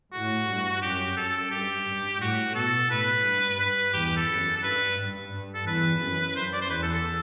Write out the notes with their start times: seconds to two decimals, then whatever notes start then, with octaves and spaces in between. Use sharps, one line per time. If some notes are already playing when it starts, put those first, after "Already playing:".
0.13 A2 F#4
0.48 G2
0.82 F#2 G4
1.17 F#2 A4
1.51 G2 G4
1.86 G2
2.20 A2 F#4
2.55 B2 A4
2.90 A2 B4
3.24 G2
3.59 G2 B4
3.93 E2 G4
4.05 G4
4.16 A4
4.29 F#2
4.56 A4
4.63 G2 B4
4.98 G2
5.32 G2
5.54 A4
5.67 E2 B4
6.01 F#2
6.36 F#2 C5
6.53 D5
6.62 C5
6.70 E2 B4
6.83 A4
6.94 A4